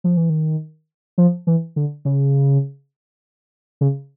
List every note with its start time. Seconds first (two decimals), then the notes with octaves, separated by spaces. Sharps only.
0.04 F3
0.17 E3
0.30 D#3
1.18 F3
1.47 E3
1.76 D3
2.05 C#3
3.81 C#3